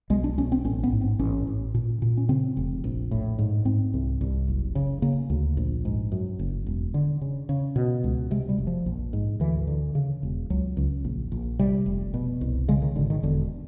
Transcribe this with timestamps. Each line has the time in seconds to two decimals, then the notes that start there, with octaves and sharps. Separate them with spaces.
0.10 B1 G#3
0.24 D4
0.38 B1 C#4
0.52 C4
0.65 A1 C#4
0.83 B3
0.93 G#2
1.01 C4
1.19 A1 C#4
1.47 A1
1.74 A#2
2.02 A#2
2.17 C#4
2.29 C#3 C4
2.57 F1
2.84 A#1
3.11 A2
3.39 G#2
3.65 G#2 C4
3.94 C2
4.21 C2
4.48 F#1
4.75 C#3
5.02 C#3 A#3
5.30 D2
5.57 A#1
5.85 G#2
6.12 F#2
6.39 F#1
6.67 E1
6.94 D3
7.21 C#3
7.49 C#3
7.76 B2
8.04 C#2
8.31 C3 G#3
8.49 G3
8.58 F1
8.67 F3
8.86 A#1
9.13 G#2
9.40 D2 E3
9.67 D3
9.95 C#3
10.23 E1
10.50 C#2 F#3
10.77 C#2
11.05 A#1
11.32 A#1
11.59 C3 G3
11.86 F1
12.14 B2
12.41 C2
12.68 C#3 G#3
12.82 D#3
12.95 G#1 D3
13.10 D#3
13.23 E1 D3